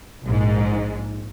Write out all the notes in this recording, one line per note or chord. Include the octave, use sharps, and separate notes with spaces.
A#1 G#2